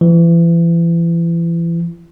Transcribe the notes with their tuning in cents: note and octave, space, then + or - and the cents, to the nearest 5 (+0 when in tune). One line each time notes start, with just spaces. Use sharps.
E3 +35